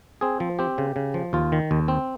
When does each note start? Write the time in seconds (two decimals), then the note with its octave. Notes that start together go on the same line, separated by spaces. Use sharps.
0.21 C4 G#4
0.40 F3
0.59 C4 G4
0.78 C#3
0.96 C#3
1.14 F3
1.33 D#2 F4
1.52 D#3
1.71 D#2
1.88 C4